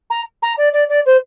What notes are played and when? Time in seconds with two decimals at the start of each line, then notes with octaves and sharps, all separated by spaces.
0.10 A#5
0.42 A#5
0.57 D5
0.73 D5
0.89 D5
1.05 C5